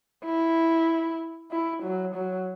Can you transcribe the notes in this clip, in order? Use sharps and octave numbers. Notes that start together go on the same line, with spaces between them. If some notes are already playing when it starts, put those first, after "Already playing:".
E4
E4
F#3
F#3